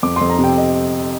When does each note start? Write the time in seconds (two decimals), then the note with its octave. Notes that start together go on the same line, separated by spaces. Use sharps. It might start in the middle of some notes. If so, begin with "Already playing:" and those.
0.03 F2 D6
0.16 C6
0.21 F2
0.30 A#5
0.39 C3
0.44 G5
0.58 D#5